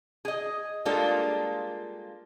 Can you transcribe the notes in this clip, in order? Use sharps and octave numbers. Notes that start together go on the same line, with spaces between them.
G#4 D#5
G3 G#3 A#3 D4 F4 A4